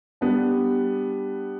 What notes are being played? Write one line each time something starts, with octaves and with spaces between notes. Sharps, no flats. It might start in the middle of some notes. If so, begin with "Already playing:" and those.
G3 B3 D4